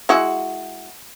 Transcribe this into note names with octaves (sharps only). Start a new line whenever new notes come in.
G#3 E4 F#4